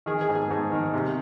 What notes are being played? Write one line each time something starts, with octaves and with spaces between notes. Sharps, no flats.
D#3 G#4
G#4
G#2
G#4
G#2
D#3
C3